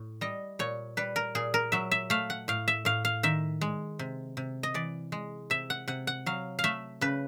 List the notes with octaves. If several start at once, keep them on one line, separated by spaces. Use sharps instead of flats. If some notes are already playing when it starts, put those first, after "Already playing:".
Already playing: A2
G3 D#5
A#2 C#5
G3 B4
A#4
A#2 G#4
A#4
F#3 E5
E5
A3 F5
F#5
A2 F5
E5
A2 F5
F5
D#3 E5
G#3
C3
C3
D#5
E3 D5
G#3
C3 E5
F#5
C3 F#5
F#5
F#3 F5
F5
A3 E5
C#3 B4